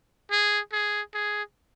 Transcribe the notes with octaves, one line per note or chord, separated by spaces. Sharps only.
G#4
G#4
G#4